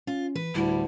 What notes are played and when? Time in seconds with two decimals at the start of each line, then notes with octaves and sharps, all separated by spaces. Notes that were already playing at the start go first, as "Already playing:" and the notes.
0.07 C#4 F4
0.36 E3 B4
0.55 D2 A2 D3 G3 E4